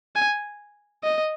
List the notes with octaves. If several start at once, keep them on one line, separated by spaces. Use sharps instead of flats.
G#5
D#5